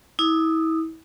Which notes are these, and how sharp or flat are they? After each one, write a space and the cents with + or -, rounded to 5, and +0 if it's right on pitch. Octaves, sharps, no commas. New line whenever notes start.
E4 -35 D#6 -30